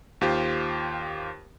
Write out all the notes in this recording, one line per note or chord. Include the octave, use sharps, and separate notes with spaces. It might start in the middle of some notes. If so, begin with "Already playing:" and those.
D#2 F4 G4 C5